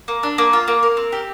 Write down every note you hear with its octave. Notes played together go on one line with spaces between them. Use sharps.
A#3
D4
A#3
F4
A#3
A#4
C4
G4